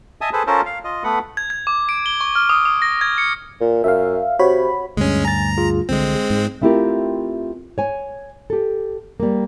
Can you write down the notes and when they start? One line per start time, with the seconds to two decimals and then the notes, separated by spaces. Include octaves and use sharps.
0.21 D#5 E5 G#5 A5 D#6
0.33 G#4 A4 B4 C5
0.47 C#4 F4 A4 A#4 C5
0.66 F5
0.84 F4 D#5
1.04 A3 B3 B4 F#5
1.37 G#6
1.50 G#6
1.67 D6
1.89 D7
2.06 G7
2.21 C#6
2.35 F6
2.49 D#6
2.65 D#6
2.82 A#6
3.01 G#6
3.18 C#7
3.61 A#2
3.84 F#2 E5 F5
4.39 C3 F#4 C#5 B5
4.97 D2 G2 G#3 C#4
5.25 G#5 A#5 A6
5.58 F4 G#4
5.89 C2 D3 G#3 C4
6.15 G#4
6.30 G#2
6.61 A3 C4 E4 F4 G4 A#4
7.78 C#5 G#5
8.50 G4 A4
9.20 G3 A#3